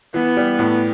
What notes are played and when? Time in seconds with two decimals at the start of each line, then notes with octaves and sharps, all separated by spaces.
0.14 E3 B3
0.37 G3
0.59 A2